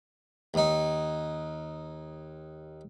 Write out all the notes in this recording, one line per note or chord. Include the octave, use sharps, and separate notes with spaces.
D#2 D#4